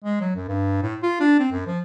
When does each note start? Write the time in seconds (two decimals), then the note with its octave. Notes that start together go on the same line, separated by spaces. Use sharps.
0.04 G#3
0.21 F#3
0.36 F#2
0.48 G2
0.83 A2
1.03 F4
1.21 D4
1.40 C4
1.52 F#2
1.67 F3